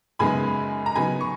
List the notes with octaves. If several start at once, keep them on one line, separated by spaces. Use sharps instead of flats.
F#2 C#3 G#3 B3 D#4 G#5 B5
A#5
C#3 F#3 B3 D#4 G#5 B5
C#6